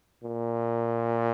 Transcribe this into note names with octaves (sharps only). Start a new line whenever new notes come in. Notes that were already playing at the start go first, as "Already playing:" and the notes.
A#2